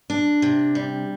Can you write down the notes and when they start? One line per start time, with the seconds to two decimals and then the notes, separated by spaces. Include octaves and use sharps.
0.10 D4
0.42 C3
0.75 G3